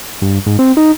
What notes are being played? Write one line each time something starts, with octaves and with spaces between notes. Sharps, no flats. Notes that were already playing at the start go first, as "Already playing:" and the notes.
G2
G#2
C4
D#4